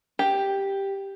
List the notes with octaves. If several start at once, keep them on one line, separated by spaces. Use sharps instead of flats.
G4